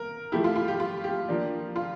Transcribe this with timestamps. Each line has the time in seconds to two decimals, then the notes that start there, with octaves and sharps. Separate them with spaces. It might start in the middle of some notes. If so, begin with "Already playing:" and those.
Already playing: A#4
0.32 F3 A3 E4 G4
0.44 F4
0.56 F4
0.68 G4
0.80 F4
1.04 G4
1.28 F3 A#3 D4
1.76 F4